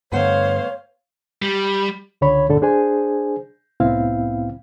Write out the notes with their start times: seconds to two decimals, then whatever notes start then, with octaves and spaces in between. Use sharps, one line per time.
0.12 G2 D3 A3 B3 C5 C#5 F5 F#5
1.42 G3
2.21 C#2 D3 C#5 B5
2.48 D2 G2 A#2 D3 A4
2.62 D4 G#4 C5 G#5
3.80 C2 A2 B3 C4 E4 F5